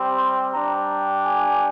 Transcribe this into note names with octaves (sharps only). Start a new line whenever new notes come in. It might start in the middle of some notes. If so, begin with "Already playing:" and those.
Already playing: G3 C4 G4
C6
G3 D4 G4 A#5
G#5